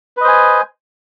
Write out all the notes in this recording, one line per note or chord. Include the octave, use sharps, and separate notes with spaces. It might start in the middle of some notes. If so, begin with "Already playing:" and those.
B4 C5 D#5 G#5